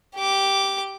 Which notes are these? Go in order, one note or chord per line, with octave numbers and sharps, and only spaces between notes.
G4 D6